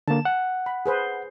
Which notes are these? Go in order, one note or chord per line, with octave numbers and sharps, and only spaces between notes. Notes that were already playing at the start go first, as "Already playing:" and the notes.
D3 A#3 A5
F#5
B5
G#4 B4 C5